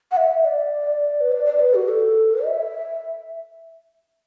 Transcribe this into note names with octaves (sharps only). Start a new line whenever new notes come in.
F#5
E5
D5
B4
D5
D5
B4
F#4
A4
E5